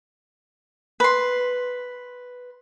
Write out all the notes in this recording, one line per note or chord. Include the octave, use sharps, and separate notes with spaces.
B4 C6